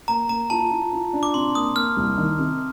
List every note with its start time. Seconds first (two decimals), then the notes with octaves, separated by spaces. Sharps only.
0.08 A#3 A#5
0.29 A#3 A#5
0.50 F4 A5
0.71 F4
0.93 F4
1.13 D4
1.23 D6
1.34 C3 C6
1.55 A#3 D#6
1.76 A#3 F6
1.97 C2
2.18 D#3
2.39 C3